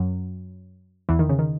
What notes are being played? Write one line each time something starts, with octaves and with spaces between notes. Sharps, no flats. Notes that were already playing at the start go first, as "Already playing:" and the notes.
Already playing: F#2 F#3
E2 E3
D#3
C#3
D#3